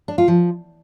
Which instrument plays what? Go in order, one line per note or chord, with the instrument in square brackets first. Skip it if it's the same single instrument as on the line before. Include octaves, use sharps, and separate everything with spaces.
[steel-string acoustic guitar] D4
F4
F3